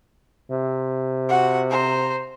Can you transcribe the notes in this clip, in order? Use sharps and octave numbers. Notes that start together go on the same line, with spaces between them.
C3
F#4 F#5
C5 A#5